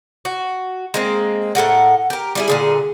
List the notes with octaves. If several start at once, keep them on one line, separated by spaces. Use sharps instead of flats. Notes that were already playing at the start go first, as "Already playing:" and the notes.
F#4
G#3 A#3 C4
A2 A4 A#4 F#5
G4 A#4
G3 E4 G#4
A#2 D3 G#4